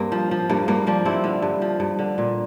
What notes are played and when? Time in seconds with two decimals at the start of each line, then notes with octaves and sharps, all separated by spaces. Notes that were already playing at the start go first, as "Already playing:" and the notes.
Already playing: G2 A#3 C4
0.12 F3
0.31 F3
0.49 G2 A#3
0.68 G2 A#3
0.87 F3 A#3 D4
1.05 G2 C4 E4
1.24 D3
1.42 G2
1.62 F3
1.80 G2
1.99 D3
2.18 A#2